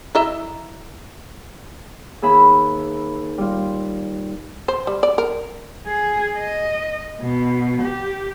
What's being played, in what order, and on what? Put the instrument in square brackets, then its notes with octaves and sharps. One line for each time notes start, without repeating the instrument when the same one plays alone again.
[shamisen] E4 D#5 E5 [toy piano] A#5
[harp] D#2 G#4 E5 B5
G3 F4
[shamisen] C5
G3
D5
A#4
[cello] G#4
D#5
B2
G4